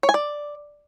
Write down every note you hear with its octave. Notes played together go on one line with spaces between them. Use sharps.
C#5
G#5
D5